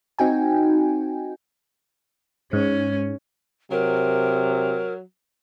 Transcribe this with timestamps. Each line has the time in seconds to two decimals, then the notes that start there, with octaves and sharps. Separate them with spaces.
0.19 C4 D#4 F#4 G5 G#5
2.53 G#2 C#4
3.71 C3 F#3 A#4